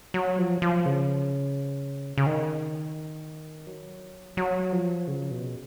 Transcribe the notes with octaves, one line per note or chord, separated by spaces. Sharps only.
F#3
F3
F3
C#3
C#3
D#3
F#3
F#3
F3
C#3
B2